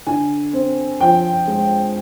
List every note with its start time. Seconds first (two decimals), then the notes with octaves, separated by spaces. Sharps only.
0.07 D3 G#5
0.53 C4
1.01 F3 G5
1.47 G#3